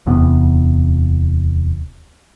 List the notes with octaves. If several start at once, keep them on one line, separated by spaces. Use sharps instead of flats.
D1 E2 C3 B3